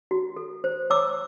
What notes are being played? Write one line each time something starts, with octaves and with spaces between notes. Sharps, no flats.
F#4
A4
C5
C#5 D6 E6